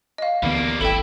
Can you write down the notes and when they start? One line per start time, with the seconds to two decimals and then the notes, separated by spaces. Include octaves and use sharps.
0.18 D#5 F5
0.43 D2 E3 G3 A#3 B3
0.81 D1 G#1 E4 A4 G5